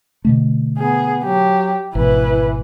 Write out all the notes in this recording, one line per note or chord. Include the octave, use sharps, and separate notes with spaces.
B2 D3 A3
B3 G#4
F#3 G4
G#1 B2 E3 E4 B4